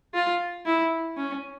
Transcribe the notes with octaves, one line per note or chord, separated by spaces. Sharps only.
F4
E4
C#4